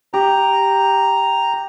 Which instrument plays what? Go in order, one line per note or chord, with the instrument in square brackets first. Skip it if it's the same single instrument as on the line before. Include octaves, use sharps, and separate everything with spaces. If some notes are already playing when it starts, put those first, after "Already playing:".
[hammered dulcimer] G4 [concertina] A#5